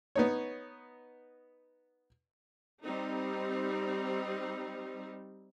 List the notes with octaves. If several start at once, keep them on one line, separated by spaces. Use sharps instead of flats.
B3 D#4 C#5
G3 C4 D#4